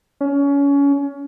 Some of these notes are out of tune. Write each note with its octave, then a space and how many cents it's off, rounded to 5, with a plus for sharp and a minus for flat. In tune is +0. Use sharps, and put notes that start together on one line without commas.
C#4 +25